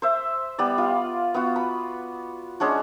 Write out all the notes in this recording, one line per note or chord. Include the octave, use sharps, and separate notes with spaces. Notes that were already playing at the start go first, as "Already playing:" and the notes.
C5 E5
G3 B3 D5
F4
B3 F4 F#4
B5
G#3 C#4 D4 F#4